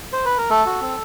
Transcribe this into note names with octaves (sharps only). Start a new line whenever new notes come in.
C5
B4
A#4
A3 A4
F#4
C4